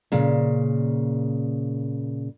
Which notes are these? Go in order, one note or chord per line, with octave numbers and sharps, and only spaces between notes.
A#2 C#3